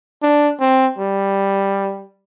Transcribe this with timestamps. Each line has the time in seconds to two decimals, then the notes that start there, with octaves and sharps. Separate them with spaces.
0.23 D4
0.61 C4
0.98 G3